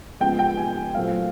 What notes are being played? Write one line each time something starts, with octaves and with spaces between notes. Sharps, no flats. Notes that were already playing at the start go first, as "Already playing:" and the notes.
C#3 F3 G#3 B3 G5
G5
G#5
A#2 F#3 A3 C4 F5